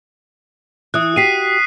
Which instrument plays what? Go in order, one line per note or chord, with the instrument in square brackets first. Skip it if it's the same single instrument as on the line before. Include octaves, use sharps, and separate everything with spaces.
[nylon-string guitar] E3 [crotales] D#6 F#6
[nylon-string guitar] F#4 G4 [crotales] B6 C7 D#7